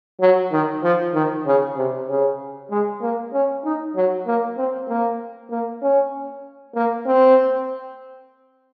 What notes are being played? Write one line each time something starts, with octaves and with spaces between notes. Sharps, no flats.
F#3
D#3
F3
D#3
C#3
C3
C#3
G#3
A#3
C#4
D#4
F#3
A#3
C4
A#3
A#3
C#4
A#3
C4